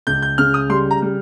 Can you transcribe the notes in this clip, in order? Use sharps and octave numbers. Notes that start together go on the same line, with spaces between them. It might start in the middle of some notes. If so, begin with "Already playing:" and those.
C#2 G6
G6
C#3 F6
D#6
G3 C6
A#5
G3